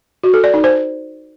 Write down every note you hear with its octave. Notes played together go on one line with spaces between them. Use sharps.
F#4
A4
D5
D#4
C5